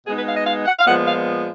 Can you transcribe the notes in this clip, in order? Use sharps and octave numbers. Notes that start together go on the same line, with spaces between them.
B2 G#3 B3 D#4 G#4
B4
F5
D#5
F5
F#5
F5
A#2 F3 G#3 B3 F#5
F5